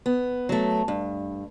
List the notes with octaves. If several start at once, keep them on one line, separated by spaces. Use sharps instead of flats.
B3
F#3 A3
G2